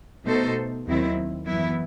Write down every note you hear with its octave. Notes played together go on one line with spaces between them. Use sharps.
B2 A3 D#4 A4 C5
D#2 D#3 F#3 C4 E4
F#2 E3 B3 E4